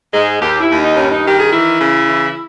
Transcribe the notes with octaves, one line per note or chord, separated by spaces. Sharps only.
G#2 G#3
D#2 G4
E4
D#2
D#4
G2 C#4
D#4
D#3 G4
G#4
E3 E4
C#3
E3